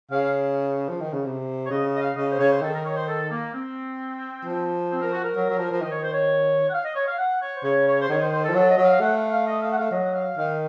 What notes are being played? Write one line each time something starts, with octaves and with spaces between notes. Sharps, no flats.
C#3 F5
F3
D#3
C#3
C3
C#5
C#3 D#5
D#5
F5
C#3 D#5
C5
C#3 C#5
C5
D#3 A4
A#4
C#5
C5
A4
A#3
C4
F3
C4
A#4
F#4
A#4
F#3
F#3
F3
F3
D#3 D#5
C#5
C5
C#5
F#5
F5
D#5
C#5
F5
F#5
C#5
C5
C#3 C#5
C#5
C5
D#3 C#5
C5
C5
A4
F3
F#3 A4
D#5
F#3
F5
A3 F#5
F5
F5
D#5
F5
F#5
A3 F5
F#3 D#5
F#5
F5
D#3 F5